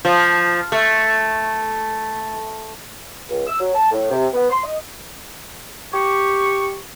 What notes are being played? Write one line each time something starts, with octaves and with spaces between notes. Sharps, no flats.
F3
A3
C#2
E6
F#3
A5
A2
C3
B3
C6
D#5
G4 C#6